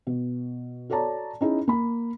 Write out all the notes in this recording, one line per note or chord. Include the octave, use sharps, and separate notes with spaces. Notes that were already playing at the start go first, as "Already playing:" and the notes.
B2
F#4 A4 C#5 D5 A5 A#5
C#4 D#4 E4 G#4
A#3 B5